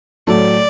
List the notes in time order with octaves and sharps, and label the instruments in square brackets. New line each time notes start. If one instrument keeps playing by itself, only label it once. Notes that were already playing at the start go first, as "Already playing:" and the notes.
[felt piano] A2 F#3 A3 [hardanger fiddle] D5